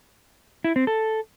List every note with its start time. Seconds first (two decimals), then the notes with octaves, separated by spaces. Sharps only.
0.64 E4
0.76 C4
0.87 A4